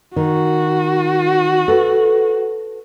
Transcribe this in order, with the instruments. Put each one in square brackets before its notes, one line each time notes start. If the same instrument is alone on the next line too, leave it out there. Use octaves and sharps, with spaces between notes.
[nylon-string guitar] D#3 [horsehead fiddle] F#4
[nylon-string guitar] A4 B4